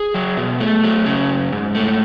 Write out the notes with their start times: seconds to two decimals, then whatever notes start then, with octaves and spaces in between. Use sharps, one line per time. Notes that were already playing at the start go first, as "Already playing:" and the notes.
Already playing: G#4
0.14 F#3
0.37 B2
0.60 A3
0.84 F#3
1.06 C#3
1.30 F#2
1.53 G#2
1.75 A3